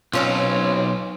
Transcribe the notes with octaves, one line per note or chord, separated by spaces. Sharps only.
B1 C4 C#4 F4